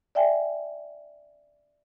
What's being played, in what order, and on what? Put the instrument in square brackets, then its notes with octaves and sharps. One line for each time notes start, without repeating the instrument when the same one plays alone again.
[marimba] D5 E5 G5 G#5